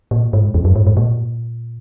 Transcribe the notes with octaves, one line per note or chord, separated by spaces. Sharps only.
A#2
G#2
E2
F#2
G#2
G#2
A#2